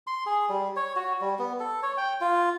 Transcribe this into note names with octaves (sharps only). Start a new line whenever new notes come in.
C6
G#4
G3
C#5
F#4
G3
B3
A4
C#5
G5
F4